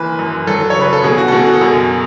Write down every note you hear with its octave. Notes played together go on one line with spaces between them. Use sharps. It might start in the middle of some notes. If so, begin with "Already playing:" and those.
Already playing: F#1 E3 B4
F#2
F#3 A4
C#5
C#3
B4
A4
B2 G#4
F#4
A4
B2 G#4
F#4
A4
F#2 G#4